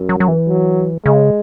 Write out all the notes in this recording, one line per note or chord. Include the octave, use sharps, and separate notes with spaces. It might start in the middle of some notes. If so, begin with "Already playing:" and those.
Already playing: F#2
F#3
F#3
E3
F#3
C#3 G#3